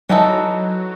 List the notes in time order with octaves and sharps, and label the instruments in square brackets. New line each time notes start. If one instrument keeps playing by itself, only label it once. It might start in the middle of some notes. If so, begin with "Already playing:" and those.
[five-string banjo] E3 G#3 D#4 A4 [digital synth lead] F#3